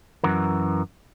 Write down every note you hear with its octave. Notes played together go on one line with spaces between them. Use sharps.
F#2 E3 F#4 A#4